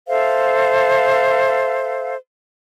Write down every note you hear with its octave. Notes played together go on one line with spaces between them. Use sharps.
A4 C5 E5 F5